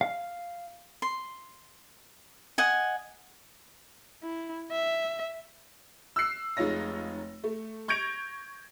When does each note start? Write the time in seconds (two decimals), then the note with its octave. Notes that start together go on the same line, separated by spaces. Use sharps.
0.01 F5
1.02 C6
2.58 D#5 F#5 G#5
4.23 E4
4.72 E5
6.16 E6 F#6 C7
6.57 F1 G#3 D#4 F4 C#5 A#6
7.44 A3
7.88 C#6 G6 G#6 A#6 D7 F7